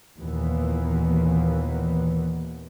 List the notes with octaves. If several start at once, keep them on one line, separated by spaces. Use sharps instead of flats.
D#2 A#2 E3 A#3 B3